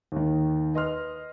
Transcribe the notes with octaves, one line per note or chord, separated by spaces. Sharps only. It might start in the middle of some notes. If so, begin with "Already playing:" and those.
D#2 D#3
B4 D#5 C6 F6